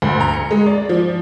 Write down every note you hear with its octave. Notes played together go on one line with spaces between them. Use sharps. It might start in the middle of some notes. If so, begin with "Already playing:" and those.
D2
A#5
C#7
G#3
D5
F3